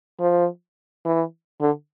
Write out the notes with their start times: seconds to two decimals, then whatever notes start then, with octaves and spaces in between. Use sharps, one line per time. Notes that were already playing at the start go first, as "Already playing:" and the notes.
0.20 F3
1.05 E3
1.61 D3